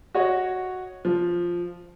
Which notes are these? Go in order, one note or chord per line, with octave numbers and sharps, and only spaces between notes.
F#4 C#5 D#5
F3